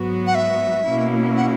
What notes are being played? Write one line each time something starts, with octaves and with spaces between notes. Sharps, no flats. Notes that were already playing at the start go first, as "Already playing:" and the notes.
Already playing: G#2 F#3 B3 F#4
F#5
E5
B2 A#3 C#4 E4
F#5